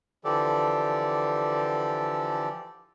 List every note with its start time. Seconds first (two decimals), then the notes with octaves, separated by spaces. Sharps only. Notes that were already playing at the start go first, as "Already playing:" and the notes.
0.25 D3 E3 F3 G4 A4 D5